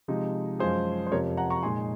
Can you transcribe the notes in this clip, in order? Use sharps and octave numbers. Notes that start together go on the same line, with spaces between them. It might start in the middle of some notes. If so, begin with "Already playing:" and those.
C3 F3 G#3 D#4
F#2 F3 G#3 C#4 F4 G#4 C5
C5
F2 C3 F3 A#4 C#5
F#5 A#5
A#5 C#6
A#2 G#3 D#4 G#5 C6